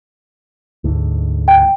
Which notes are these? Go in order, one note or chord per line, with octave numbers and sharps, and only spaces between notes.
D2 G#2
G5